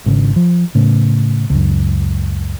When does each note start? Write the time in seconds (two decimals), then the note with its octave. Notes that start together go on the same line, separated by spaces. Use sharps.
0.06 G#1 C#3
0.36 F3
0.75 A2 C#3
1.50 C#2 F#2